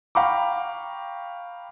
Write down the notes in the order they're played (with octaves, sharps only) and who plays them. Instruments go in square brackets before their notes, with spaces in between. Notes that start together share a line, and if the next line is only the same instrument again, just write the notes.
[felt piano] F5 G5 A#5 B5 C#6 D6